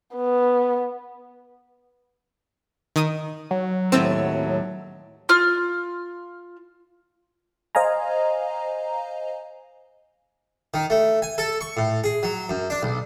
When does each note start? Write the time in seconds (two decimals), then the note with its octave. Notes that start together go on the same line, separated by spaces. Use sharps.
0.15 B3
2.96 D#3 D#6 D#7
3.51 F#3
3.92 D#2 A2 C4 E6
5.29 F4 F6
7.75 C5 D#5 F5 G#5 A#5
10.74 D#3
10.90 A3
11.22 G#5
11.38 A4
11.61 C#6
11.77 A2
12.04 G#4
12.23 F#3
12.49 F#2
12.70 D4
12.83 B1